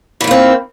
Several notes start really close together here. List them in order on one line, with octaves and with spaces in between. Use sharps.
E3 D#3 A#3 C4